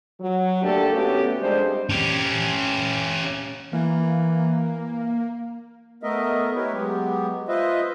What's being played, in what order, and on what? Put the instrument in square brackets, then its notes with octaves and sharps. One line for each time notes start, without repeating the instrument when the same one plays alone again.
[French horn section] F#3
D3 A3 A#3 D4 G4 A4
A2 A3 B3 C#4 F#4 G4
F2 G3 G#3 D4 G#4 C5
[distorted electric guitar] C#4 G4
[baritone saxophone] E3 [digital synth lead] A#3
[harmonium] A3 B3 A#4 D#5 E5
E4 G4 A#4 B4 C#5
F#3 G#3 B3 G4
F4 B4 C5 D#5 E5